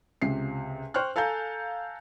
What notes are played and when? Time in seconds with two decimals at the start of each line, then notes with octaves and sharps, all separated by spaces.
0.22 C#2 C3 C7
0.94 C5 G5 C#6 F6 F#6
1.16 A4 F5 G#5 A#5 G6